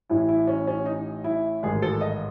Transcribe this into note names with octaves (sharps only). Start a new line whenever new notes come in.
A1 A2 E3 E4
E4
C#4
C#4
D#4
E4
A1 G#2 D#3 G#4
A4
D#5